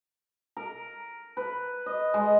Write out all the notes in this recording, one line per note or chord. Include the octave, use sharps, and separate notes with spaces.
A#4
B4
D#5
G#3